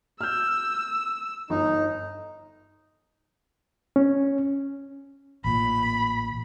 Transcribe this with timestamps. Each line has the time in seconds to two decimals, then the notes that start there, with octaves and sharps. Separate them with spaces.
0.21 E6 F6 G6
1.50 G1 D#4
3.96 C#4
5.44 A1 A#2 B5